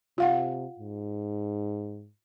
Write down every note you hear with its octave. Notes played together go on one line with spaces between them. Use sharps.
C3 F4 F5 F#5
G#2